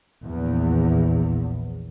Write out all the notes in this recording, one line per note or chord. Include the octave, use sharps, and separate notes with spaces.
A#1 E2